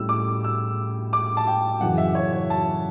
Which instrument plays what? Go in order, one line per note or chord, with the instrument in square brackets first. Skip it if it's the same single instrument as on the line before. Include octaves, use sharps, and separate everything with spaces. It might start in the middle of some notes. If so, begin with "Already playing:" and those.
Already playing: [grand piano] A2 G3 C#4 E4 E6
D6
E6
D6
A5
G5
F#2 C#3 E3 F#5
E5
C#5
C#5
A5